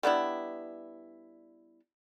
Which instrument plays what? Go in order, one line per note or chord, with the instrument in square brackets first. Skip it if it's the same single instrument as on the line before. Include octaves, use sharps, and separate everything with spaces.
[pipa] G3 B3 D4 E4